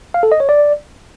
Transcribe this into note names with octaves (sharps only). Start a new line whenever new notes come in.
F5
A4
D#5
C#5
D5